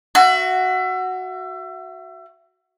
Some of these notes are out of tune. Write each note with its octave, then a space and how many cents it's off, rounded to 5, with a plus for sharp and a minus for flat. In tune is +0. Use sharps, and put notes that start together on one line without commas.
F#4 +0 E5 +30